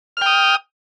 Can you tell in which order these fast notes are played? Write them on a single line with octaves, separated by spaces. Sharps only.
F6 G5 D#6